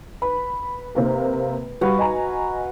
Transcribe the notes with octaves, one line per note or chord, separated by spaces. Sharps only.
B4 B5
C3 A#3 A#4
G3 F#4 B4 F5
D#5 G#5 A#5